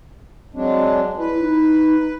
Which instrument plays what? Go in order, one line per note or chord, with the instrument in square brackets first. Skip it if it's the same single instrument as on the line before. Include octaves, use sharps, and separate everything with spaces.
[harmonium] F#3 G#3 D4 [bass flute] C4
[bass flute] E4 [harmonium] B4
[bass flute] D#4